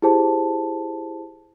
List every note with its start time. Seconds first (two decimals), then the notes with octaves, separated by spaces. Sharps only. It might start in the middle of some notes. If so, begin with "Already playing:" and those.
0.02 E4 G4 G#4 C5 A5